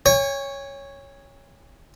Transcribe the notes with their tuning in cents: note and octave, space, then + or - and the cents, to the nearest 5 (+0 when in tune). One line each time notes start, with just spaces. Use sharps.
C#5 +0 G#5 -45